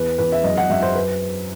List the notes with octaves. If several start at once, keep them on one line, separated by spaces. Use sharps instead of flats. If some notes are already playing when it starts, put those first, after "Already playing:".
Already playing: E2 B4
E2 B4
E5
F#2 D#5
F#5
F#2 E5
C5
B4